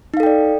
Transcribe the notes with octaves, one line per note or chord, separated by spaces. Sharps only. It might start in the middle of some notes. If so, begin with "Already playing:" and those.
D#4 A4 D5 F5 G5